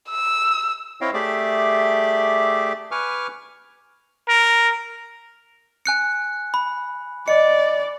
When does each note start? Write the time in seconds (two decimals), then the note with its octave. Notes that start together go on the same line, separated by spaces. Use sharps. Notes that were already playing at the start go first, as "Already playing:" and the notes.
0.10 E6
1.01 C4 E4 C#5 D#5 F5 G5
1.14 A3 G4 G#4 D5 E5 D6
2.91 B4 G#5 C#6 D6 F6
4.28 A#4
5.86 G#5 F#6 C#7
6.54 B5
7.28 D5 D#5 C#7